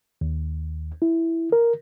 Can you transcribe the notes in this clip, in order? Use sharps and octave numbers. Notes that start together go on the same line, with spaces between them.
D#2
E4
A#4